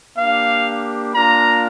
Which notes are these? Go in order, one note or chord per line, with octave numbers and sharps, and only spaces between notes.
A#3 D4 G4 F5
A#3 D4 F4 A#5